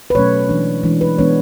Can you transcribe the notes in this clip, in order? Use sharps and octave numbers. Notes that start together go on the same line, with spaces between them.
B4
B2 F#3 A3 C#4 C#5
E3 G#3 D4
E3 G#3 D4
B4
E3 G#3 B3 D4 C#5